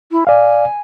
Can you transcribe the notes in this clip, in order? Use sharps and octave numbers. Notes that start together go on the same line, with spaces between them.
E4
D5 F5 G#5